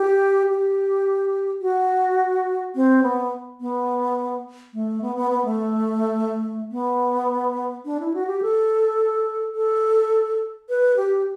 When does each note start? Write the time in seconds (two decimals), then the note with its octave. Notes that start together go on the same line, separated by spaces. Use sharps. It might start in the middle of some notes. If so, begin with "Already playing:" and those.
Already playing: G4
0.49 G4
1.61 F#4
2.75 C4
3.03 B3
3.61 B3
4.74 A3
5.02 B3
5.16 B3
5.31 B3
5.45 A3
6.72 B3
7.85 D4
8.00 E4
8.14 F#4
8.27 G4
8.42 A4
9.55 A4
10.69 B4
10.97 G4